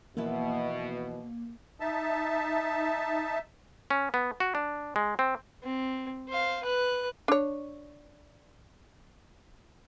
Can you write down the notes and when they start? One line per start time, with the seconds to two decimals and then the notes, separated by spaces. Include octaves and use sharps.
0.17 B2 E3 F3 A#3 E4
1.80 D#4 E5 A5
3.91 C#4
4.14 B3
4.40 F#4
4.55 D4
4.96 G#3
5.19 C4
5.63 C4
6.28 C5 F5
6.63 B4 F#6
7.28 D4 C#5